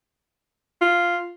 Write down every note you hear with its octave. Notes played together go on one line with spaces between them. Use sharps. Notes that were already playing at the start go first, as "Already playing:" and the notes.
F4